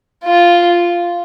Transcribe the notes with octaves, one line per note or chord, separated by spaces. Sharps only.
F4